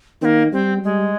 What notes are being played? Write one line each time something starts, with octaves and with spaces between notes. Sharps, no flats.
D#3 A#3 C4
G3 C4
G3 G#3